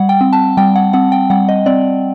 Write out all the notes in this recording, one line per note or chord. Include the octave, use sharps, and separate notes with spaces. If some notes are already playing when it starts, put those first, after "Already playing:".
Already playing: G3 F#5
G5
C4
A5
G3 G5
F#5
C4 F#5
G5
G3 F#5
D#5
C4 D5